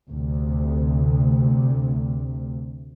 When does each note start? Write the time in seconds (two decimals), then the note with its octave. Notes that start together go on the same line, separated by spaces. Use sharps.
0.10 D2 C3